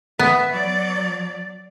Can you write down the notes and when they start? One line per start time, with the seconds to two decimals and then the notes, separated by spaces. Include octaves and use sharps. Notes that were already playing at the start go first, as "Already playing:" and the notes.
0.19 B3 E5
0.50 F#3 D5